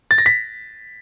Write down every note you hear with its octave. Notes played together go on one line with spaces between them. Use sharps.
A6
A#6
B6